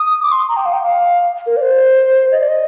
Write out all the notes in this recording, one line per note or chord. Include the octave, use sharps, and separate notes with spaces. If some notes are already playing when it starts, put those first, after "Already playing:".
Already playing: D#6
D6
C6
A#5
G5
F5
G5
F5
A#4
D5
C5
D#5
D5
D#5